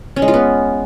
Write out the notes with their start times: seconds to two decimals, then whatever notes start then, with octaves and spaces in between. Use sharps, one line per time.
0.16 C#4
0.22 G#3
0.28 F4
0.34 B3